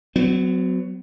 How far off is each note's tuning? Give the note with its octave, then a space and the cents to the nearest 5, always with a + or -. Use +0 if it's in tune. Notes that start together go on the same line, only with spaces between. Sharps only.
F#3 +0 B3 +45